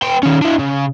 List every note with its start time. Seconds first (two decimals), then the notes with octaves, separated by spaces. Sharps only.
0.02 B3 G5
0.23 D#3 C#4
0.41 D4 E4
0.59 C#3